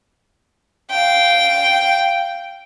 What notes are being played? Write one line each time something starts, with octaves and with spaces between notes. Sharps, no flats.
F5 G5